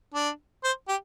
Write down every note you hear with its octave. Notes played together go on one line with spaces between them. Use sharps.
D4
C5
G4